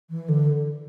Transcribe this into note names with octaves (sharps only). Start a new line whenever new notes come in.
E3
D3